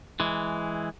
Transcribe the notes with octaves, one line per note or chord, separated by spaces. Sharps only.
E3 G#3